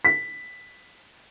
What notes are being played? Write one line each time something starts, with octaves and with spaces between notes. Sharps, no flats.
B6